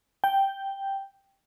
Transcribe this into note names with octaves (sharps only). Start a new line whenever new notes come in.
G5